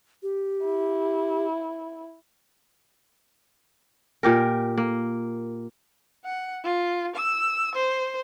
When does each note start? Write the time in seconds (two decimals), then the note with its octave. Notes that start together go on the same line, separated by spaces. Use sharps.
0.23 G4
0.64 E4
4.23 A#2 G4 A#4
4.78 A#3
6.25 F#5
6.64 F4
7.16 E6
7.75 C5